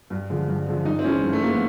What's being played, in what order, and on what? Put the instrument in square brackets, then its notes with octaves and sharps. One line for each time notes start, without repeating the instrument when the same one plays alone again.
[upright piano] G2
D3 F3 G#3
G2
D3 F3 G#3
G2 D#4
C4
E3 G#3 C#4
G2
A3
E3 G#3 A#3
B3